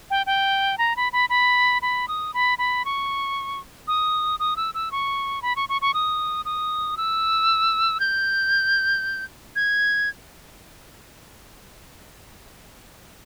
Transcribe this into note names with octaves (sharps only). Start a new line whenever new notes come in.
G5
G5
A#5
B5
B5
B5
B5
D#6
B5
B5
C#6
D#6
D#6
E6
E6
C#6
B5
C#6
C#6
C#6
D#6
D#6
E6
G6
G#6